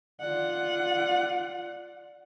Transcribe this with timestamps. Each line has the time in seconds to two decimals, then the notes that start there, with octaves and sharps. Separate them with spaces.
0.21 F4 D5 F#5